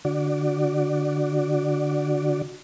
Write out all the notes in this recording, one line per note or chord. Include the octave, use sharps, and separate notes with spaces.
D3 F#4 D5